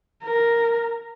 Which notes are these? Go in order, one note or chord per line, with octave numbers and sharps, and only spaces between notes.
A#4